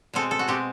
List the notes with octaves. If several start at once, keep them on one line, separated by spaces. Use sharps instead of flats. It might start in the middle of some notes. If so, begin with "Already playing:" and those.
B2 G#3 C4 A4
A4
F#4
B2 G#3 C4 G4